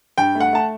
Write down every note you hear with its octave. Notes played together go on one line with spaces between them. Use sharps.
G2 G5
A3
F#5
A3 A5